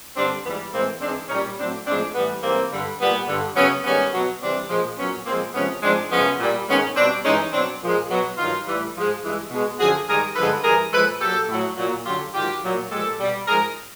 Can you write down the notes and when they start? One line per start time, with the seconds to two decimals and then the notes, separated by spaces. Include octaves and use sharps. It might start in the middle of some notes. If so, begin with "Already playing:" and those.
0.16 G2 D3 G3 C4 D4
0.44 G#2 E3 G3 B3
0.73 A2 E3 G#3 A#3 C4
1.01 G#2 E3 G#3 C4 D4
1.29 A#2 G3 C#4 D#4
1.58 A2 F#3 C4 D4
1.86 A2 F3 G#3 C4 D4
2.14 A2 E3 G3 B3
2.43 G#2 E3 G3 A#3 C4
2.71 G2 D3 G3
3.00 A#2 G3 B3
3.28 G2 D3 G3
3.56 F#2 C#3 F#3 B3 C#4
3.84 G#2 D#3 G3 B3 C#4
4.13 B2 F#3
4.41 C3 E3 G3 C4 D4
4.69 A#2 F3 G#3
4.98 A#2 F#3 B3 C#4
5.26 A#2 F3 G#3 A#3 C4
5.54 C3 F3 G#3 B3 C#4
5.83 G#2 F3 G#3 C4 D4
6.11 F#2 C#3 F3 G#3 B3 C#4
6.39 A#2 G3
6.67 G#2 D#3 G#3 B3 C#4
6.96 B2 G3 C4 D4
7.24 G2 E3 G#3 C#4 D#4
7.52 B2 F#3 C4 D4
7.82 A#2 F3 G#3
8.10 B2 F#3
8.37 G2 D#3 F#3 D#4 F4
8.66 A2 E3 G3
8.95 G#2 F3 G#3
9.23 G2 E3 G#3
9.51 B2 G#3
9.79 F#2 D3 F3 F#4 G#4
10.07 G#2 D#3 G3 G#4 A#4
10.36 G2 D3 F3 G#3 A4 B4
10.64 G2 E3 G3 G#4 A#4
10.93 A#2 F3 G#3 A4 B4
11.21 A#2 F#3 G4 A4
11.49 A2 F#3
11.77 A#2 F#3
12.06 F#2 D3 F#3 F4 G4
12.34 G#2 D#3 F#3 F4 G4
12.63 A#2 F#3
12.91 A#2 F3 G#3 G4 A4
13.20 B2 G3
13.47 G#2 F3 G#3 G#4 A#4